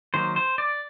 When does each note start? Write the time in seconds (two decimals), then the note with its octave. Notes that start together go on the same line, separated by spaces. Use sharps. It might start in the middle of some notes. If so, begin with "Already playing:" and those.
0.14 D#3 F#3 A#3 C5
0.36 C5
0.58 D5